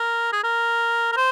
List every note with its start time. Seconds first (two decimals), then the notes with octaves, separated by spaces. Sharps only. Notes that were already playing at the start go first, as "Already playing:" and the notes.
Already playing: A#4
0.32 G#4
0.44 A#4
1.12 A#4
1.17 C5